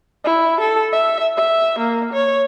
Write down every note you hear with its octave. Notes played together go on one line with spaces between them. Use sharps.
E4
A4
E5
E5
A#3
C#5